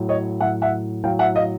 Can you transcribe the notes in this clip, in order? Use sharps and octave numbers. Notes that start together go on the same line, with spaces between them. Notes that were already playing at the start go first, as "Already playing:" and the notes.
Already playing: A2 F#3
C#5 D#5
A2 F#3 E5 F#5
E5 F#5
A2 F#3 F5 G5
E5 F#5
D#5 F5